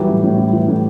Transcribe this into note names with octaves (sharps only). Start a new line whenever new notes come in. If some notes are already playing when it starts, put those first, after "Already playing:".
Already playing: E3 F#3 G3
A2
A2
G3
E3
A2